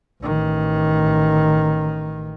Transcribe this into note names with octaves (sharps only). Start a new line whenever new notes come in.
A1 D#3